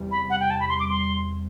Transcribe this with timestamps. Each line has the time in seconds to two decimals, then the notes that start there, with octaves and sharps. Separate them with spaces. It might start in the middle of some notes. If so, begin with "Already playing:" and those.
Already playing: E2 C3 G3
0.11 B5
0.30 F#5
0.40 G5
0.50 A5
0.60 B5
0.69 C6
0.80 D6
0.89 C6